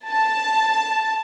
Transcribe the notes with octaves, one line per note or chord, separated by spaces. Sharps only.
A5